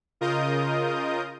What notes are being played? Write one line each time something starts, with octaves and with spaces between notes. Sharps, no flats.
C#3 F4 A#4 D#5 D#6 G6